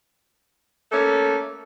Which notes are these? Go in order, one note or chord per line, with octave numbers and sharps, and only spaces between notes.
A3 A#3 C#4 A4